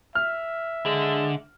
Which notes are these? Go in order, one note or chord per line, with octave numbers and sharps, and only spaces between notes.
E5 F6
D3 G#3